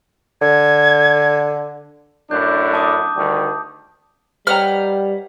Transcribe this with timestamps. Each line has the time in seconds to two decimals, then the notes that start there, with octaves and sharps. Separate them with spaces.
0.42 D3 G#6
2.31 F#2 A2 D4 G6
2.73 A5 D6 D#6
3.16 D2 D#3 G3
4.47 G3 B4 C#5 D#5 F#5 G5 A#5 F6